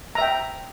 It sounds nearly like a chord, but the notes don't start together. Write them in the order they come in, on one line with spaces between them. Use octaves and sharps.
A#5 E5 G5